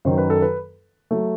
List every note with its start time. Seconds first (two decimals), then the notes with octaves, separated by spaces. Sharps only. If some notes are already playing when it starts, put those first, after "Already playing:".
0.05 F#2 D#3 F#3 C5
0.18 B4
0.30 A4
0.42 B4
1.11 F#3 A3